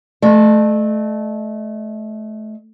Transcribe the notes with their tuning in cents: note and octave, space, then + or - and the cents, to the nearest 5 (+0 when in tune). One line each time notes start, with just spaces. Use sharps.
A3 -20 D#5 -45